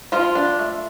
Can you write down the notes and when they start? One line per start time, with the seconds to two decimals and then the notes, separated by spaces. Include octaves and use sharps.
0.12 F3 F4
0.35 D4
0.59 A3